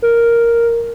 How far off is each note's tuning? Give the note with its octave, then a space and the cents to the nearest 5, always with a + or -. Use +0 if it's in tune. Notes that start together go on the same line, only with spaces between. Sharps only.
A#4 +0